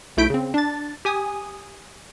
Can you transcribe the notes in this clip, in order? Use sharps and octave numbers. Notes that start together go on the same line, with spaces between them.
B1 A3 E4 G6 B6 D7
C#3 C4
D4 A6
G4 G#5 D#6